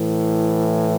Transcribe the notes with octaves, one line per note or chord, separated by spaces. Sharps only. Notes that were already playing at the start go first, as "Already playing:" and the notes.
Already playing: A2 E3